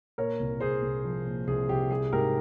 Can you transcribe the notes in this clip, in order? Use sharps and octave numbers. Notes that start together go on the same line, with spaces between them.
A#2 A#4 C#5
C2
C2 G#4 C5
C2
F3
A#2
C2 G#4
C2 G4
G3 G#4
G#2 G4 A#4